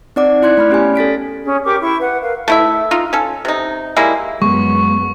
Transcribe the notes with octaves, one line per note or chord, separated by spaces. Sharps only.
C4 D#4 D5 F#5 D6
E4 D5 C6 F#6 G#6 C#7
A3 B5 F6
B3 C#4 G4 D5 G#5
A4 A6 B6 D7
C#4 G#4
G4 A#4 C#6 D6
E4 C#6
B4 F#5
A#4 B4 F5
A3 E4 E5
D#4 F4
C#4 A4
C3 D#4
G3 G#3 A#3 E4
F#2 G#3 B3 C#6